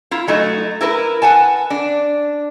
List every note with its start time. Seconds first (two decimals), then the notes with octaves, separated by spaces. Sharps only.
0.11 E4 F4
0.27 F#3 A3 D#4
0.81 E4 A#4 B4
1.22 B4 F#5 G#5 A5
1.70 D4